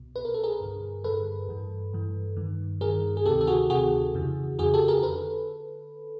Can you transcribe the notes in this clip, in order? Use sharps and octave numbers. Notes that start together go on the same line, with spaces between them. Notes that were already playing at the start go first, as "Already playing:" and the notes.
Already playing: C2 B2
C2 B2 B4
A#4
A4
G#4 A#4
G2 D3
G2 D3 A4 B4
G2 E3
G2 E3
G2 D#3
G2 D#3 G#4 A#4
G#4
D2 C3 D#3 G4 A4
A4
F#4 G#4
D2 C3 D#3 F#4 G#4
F2 C#3 E3
F2 C#3 E3 F#4 G#4
G4 A4
G#4 A#4
D3 A4 B4